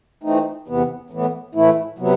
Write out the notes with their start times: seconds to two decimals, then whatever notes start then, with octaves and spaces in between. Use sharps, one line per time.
0.23 E3 A3 C4 D#4
0.68 E2 C3 E3 B3
1.10 A2 E3 B3
1.55 A2 E3 A3 E4
1.99 C3 F#3 B3